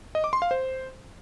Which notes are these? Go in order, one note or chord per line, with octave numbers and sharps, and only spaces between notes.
D#5
D6
C6
F5
C5